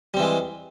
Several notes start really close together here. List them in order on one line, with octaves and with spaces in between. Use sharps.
G3 C4 E3 G#3